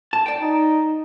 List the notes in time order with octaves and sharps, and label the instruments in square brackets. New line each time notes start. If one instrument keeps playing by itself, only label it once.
[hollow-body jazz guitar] A5
D5 G5
[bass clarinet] D#4